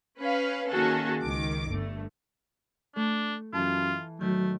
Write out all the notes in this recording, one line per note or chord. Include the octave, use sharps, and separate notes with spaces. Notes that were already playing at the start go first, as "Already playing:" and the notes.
C#4 B4 F5
D#3 A#3 C#4 F#4 G#4 A4
C#2 D#3 D6
G1 G2 A3
A3 D4
F#2 E3 F4 A5
A2 D#3 F#3 A3 G6